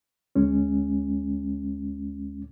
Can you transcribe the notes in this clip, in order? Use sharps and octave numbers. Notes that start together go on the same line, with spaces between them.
D2 G#3 C#4